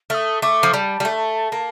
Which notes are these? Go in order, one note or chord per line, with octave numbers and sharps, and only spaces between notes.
A3 D#6 F6
A3 D6
F3
G3 A5
G3
A3
A#3